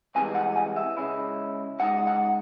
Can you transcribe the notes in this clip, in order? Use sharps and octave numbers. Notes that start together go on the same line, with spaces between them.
C2 C3 E3 G#3 G#5
F#5
G#5
E5
C#2 C#3 G#3 C#4 E4
C#3 G#3 D#4 F#5
F#5